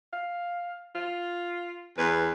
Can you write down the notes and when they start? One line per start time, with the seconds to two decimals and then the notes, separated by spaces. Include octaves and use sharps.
0.13 F5
0.95 F4
1.98 E2 B4